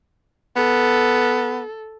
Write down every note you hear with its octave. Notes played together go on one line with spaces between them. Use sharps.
B3 A4